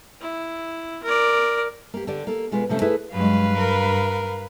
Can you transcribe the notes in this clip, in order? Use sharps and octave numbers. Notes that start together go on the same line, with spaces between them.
E4
A#4 D5
A#3 G4
D3 G4 D5
A#3 A4
B2 G#3 F4 B4
C3 F3 A3 C#4
A3 E4 G#4 A4 B4
G2 F#3 G#3 B4 F5
A#4